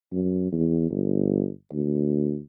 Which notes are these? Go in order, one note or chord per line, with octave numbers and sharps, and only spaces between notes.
F#2
E2
G1
D2